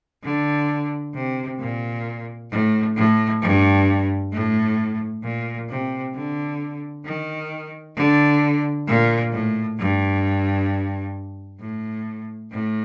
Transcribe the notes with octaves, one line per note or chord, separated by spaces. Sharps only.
D3
C3
A#2
A2
A2
G2
A2
A#2
C3
D3
D#3
D3
A#2
A2
G2
A2
A2